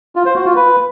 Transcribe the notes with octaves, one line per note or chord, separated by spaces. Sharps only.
F4
C5
F#4
F4
B4